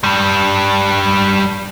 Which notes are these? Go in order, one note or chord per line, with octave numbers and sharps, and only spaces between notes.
G2 G3